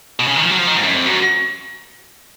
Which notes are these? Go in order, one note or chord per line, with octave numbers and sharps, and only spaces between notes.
B2
C#3
D#3
F3
F#3
F3
D#3
G#2
F#2
F2
F#2